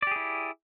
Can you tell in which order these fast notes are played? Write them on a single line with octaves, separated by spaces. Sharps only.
D5 G4 G#4 E4